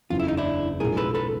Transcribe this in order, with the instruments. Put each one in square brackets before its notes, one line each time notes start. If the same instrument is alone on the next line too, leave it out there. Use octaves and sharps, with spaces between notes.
[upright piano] F#1 E2 C#3 [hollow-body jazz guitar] F4
[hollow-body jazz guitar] E4
D#4
D4 E4
[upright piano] B1 A2 F3 G#3 [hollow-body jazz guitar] G#4 A#4
[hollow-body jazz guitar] A4 B4
A4 B4